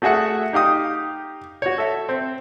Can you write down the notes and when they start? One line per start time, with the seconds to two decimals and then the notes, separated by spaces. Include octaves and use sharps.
0.02 A3 F#4 G#4 E5 F#5
0.53 D#4 G4 F5 D#6
1.62 F#4 C#5
1.78 A4 E5
2.09 C4